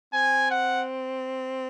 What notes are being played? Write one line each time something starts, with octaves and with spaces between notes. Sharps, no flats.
C4 G#5
F#5